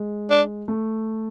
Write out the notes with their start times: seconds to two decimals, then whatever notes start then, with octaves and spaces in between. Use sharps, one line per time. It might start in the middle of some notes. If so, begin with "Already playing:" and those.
Already playing: G#3
0.30 D4
0.68 A3